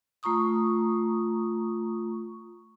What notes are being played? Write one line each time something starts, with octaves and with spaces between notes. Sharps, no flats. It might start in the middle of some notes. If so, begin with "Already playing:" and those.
A3 F4 A#5 C#6 D#6